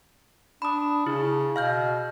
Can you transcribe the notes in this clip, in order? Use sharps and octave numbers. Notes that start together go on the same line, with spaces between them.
D4 B5 D#6
C#3 E4
B2 F5 F6 G6